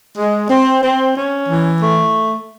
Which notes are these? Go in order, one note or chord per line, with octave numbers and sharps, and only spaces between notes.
G#3
C4
C4
C#4
E3
A3